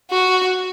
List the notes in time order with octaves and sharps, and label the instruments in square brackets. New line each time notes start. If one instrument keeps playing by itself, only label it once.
[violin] F#4